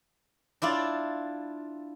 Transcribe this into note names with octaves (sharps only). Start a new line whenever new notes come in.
D4 E4 F4 D5